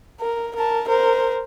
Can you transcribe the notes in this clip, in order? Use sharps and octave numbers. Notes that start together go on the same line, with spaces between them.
A#4
A#4 A5
A#4 C5